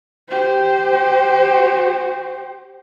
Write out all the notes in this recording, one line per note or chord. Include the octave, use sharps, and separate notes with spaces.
G4 C5